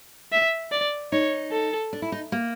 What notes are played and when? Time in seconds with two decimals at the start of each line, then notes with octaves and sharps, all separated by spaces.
0.33 E5
0.72 D5
1.12 D#4 C#5
1.52 A4
1.93 D4
2.02 E4
2.12 D#4
2.32 A#3